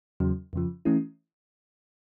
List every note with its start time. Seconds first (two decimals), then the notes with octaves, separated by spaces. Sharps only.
0.20 E2 C#3 F#3
0.53 F2 C#3 F3
0.85 E3 A3 C#4 E4